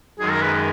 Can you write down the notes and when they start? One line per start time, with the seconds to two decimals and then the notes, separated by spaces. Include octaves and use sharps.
0.19 F#2 D#3 G#3 G#4
0.30 A#4
0.41 B4